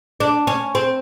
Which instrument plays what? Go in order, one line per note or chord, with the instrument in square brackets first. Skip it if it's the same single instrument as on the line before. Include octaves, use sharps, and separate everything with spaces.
[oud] D4
C#4
C4